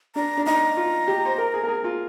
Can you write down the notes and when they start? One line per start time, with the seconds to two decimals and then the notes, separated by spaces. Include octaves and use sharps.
0.15 D4 A#5
0.37 D4
0.46 D#4 A#5
0.77 F4
1.07 G4
1.25 C5
1.38 A#4
1.54 G#4
1.63 A#4
1.68 G#4
1.84 F4